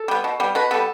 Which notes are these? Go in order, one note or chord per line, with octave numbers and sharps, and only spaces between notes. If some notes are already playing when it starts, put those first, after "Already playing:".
Already playing: A4
G3 B3
B2
G3 B3
B2 B4
G3 B3 A4